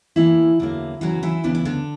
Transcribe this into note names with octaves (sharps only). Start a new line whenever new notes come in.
E2 D3 E3 F#3 A#3 E4
E2 D3 F#3 A#3
D2 C#3 E3 F#3 B3 F#4
E3 E4
D2 C#3 E3 B3 D4
E4
D3 D4